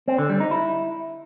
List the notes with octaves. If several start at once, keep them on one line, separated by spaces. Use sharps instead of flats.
C4
D3
G3
D#4
E4